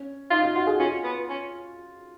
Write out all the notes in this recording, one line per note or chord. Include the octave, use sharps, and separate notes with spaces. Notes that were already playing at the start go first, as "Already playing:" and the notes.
Already playing: C#4
D#4 F4
F4
F4 F#4
G#4
C#4 F4
B3
C#4